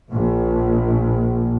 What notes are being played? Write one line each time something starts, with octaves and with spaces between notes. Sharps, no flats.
A#1